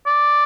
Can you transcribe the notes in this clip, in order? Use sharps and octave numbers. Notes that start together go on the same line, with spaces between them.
D5